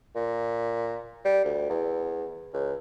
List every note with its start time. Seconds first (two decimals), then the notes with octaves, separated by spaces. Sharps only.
0.15 A#2
1.25 G3
1.44 D2
1.69 E2
2.53 C#2